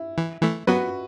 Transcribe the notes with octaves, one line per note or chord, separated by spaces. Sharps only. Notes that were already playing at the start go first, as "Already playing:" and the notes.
Already playing: E4
E3
E3 A3
F#3 B3 F#4 B4